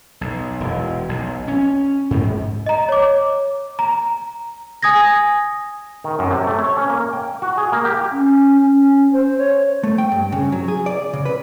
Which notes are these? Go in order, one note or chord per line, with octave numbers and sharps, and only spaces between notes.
B1
E1
B1
C#4
G#2
D#5 A#5
C#5 D6
A#5
G#5 D#6 G#6 A#6
D#3
F#2
C3
A3
C#5
C#4
A#3
G5
F#4
G#4
A#3
G4
C#4
C#4
C5
C#5
A3
G5
G2
C#3
F#3
G#4
D5
C#3
B4